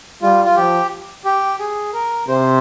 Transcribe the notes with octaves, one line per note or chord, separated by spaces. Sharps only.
G3 F4
F4
F3 G4
G4
G#4
A#4
C3 C5